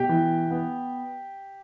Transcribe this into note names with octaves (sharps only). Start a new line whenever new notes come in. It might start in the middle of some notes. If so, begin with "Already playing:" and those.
Already playing: B2 G4 G5
E3
B3